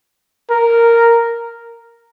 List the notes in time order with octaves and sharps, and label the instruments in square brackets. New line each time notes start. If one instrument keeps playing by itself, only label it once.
[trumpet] A#4